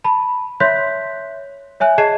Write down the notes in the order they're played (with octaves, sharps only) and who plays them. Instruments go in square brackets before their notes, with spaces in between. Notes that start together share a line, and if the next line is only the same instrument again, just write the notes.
[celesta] A5 B5
C#5 E5 C6 F#6 G6 B6
C#5 E5 G#5 F#6
G#4 D#5 A5 G#6 C7 E7